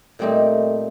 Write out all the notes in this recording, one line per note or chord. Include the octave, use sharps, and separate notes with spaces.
A#2 G3 A3 C4 D#4